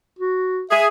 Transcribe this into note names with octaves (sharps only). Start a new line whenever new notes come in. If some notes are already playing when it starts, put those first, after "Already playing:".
F#4
G#4 E5